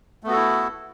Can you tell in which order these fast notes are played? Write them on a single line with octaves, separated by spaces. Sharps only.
A3 B3 F#4 A4 E4